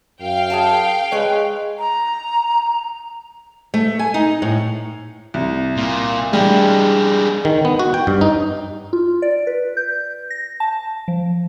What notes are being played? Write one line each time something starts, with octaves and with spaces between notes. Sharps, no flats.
F#2 F5 G5
G#4 F#5 A5
G#3 B4 C#5
A#5
A3
G#5
D#4
A2
C2
A#2
G3 G#3 D4
D#3
B3
F#4
G5
G2
D#4
F4
D5
B4
G6
A#6
A5
F3